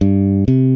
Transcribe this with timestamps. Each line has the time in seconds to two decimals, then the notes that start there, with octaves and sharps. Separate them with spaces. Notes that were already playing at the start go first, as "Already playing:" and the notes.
0.01 G2
0.48 C3